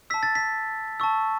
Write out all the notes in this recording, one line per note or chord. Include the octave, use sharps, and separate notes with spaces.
A5 E6 B6
A6
B6
A5 C#6 E6